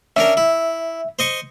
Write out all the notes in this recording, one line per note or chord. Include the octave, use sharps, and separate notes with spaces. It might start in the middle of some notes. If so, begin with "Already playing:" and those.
C#4 D4 A#4 E5
E4
C5 D#5 C#6